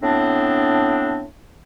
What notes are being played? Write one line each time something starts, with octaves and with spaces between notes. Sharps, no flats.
A2 B3 C4 D4